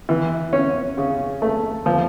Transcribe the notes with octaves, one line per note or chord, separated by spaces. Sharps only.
E3
C#4
C#3
A3
F3